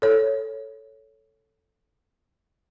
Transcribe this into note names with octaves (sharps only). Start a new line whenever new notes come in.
A4 C#5